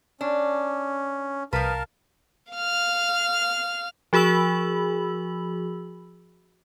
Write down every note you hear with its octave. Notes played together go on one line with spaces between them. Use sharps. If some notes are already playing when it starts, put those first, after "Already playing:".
C#4 D4
C2 F3 A#4 B4 F5 A5
F5 F6
F3 F#4 G#4 B5 E6 F#7